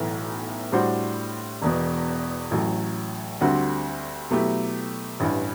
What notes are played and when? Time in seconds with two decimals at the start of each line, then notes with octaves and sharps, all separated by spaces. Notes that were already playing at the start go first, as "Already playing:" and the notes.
Already playing: B1 A2 E3 A3
0.72 A2 G3 D4 F#4 C5
1.62 E1 E2 B2
2.51 A1 A2 F#3
3.41 D2 D3 G3 C4 F#4
4.31 B2 F#3 A3 E4 G4
5.20 A1 G2 E3